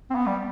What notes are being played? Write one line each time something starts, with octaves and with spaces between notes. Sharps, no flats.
C4
B3
G3